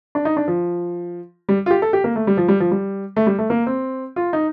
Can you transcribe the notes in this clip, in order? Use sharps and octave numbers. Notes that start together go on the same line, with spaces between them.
D4
D#4
D4
F3
G3
F4
G4
A4
G4
A#3
A3
G3
F3
G3
F3
G3
A3
G3
A3
A#3
C4
F4
D#4